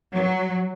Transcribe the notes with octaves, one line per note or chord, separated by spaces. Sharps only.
F#3